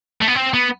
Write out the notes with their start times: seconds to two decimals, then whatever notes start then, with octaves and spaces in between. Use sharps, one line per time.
0.21 A3
0.28 B3
0.35 C4
0.54 B3